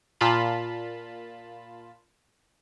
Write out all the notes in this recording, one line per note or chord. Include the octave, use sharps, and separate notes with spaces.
A#2 F4 A5 B5